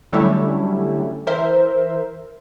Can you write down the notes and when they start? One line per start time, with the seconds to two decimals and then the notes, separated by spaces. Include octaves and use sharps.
0.12 D3 F#3 G3 A3 C#4 E4
1.27 E3 A#4 C5 E5